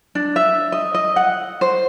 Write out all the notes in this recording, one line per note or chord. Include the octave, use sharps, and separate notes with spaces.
D4
E5
D#5
D#5
F#5
C5